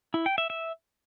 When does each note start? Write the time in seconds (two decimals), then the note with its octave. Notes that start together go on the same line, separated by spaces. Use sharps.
0.14 E4
0.26 G5
0.38 E5
0.50 E5